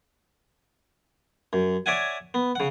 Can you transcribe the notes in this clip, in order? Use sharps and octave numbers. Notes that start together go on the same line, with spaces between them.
F#2
C#5 D5 E5 F#5 G#5
B3
C#3 F#5